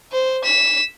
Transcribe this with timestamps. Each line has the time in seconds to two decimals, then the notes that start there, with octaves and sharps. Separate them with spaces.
0.12 C5
0.44 B6 E7